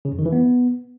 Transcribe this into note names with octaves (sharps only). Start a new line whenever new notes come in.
C#3
F2
D#3
E3
B3